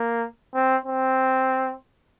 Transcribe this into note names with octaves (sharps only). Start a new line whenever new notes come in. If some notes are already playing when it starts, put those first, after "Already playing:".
Already playing: A#3
C4
C4